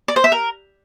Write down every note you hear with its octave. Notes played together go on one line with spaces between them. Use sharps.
D5
C5
E5
A#4